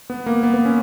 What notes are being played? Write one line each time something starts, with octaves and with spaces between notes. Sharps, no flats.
B3
A#3
B3
B3
C#4